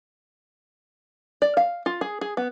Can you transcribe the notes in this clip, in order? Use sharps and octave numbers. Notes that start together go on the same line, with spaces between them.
D5
F5
F4
G#4
G#4
B3